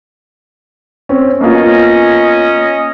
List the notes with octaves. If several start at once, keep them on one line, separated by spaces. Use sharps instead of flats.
C4 C#4
A#3 B3 C#4 F4 D#5